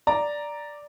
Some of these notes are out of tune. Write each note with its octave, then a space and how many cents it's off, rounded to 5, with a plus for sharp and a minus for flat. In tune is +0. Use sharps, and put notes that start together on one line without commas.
D5 +0 A#5 +0